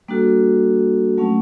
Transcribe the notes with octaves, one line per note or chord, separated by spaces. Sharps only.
G3 A#3 D4 F#4 A4
F#3 A3 C#4